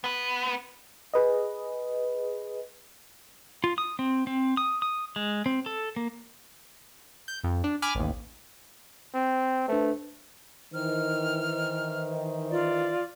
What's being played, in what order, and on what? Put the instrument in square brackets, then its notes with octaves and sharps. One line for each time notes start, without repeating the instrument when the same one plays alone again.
[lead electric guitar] B3 B4
[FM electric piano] G#4 B4 D#5
[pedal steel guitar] F4
D#6
C4
C4
D#6
D#6
G#3
C4
A4
A#3
[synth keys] G6
F2
D4
G#5 B5 D6 F6
A1 D#2
[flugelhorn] C4
[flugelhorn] A3 [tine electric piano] D4 B4 C5
[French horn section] D#3 E3 C5 [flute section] F6
[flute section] F4 D5